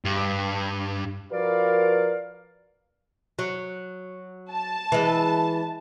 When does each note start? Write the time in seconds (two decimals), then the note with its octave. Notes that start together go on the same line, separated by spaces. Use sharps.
0.05 G2
1.32 F3 F#4 A#4 B4 D5 F5
3.39 F#3
4.52 A5
4.92 E3 G#3